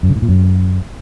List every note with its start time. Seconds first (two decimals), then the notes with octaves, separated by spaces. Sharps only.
0.03 F#2
0.09 C#3
0.16 A2
0.22 A#2
0.28 F#2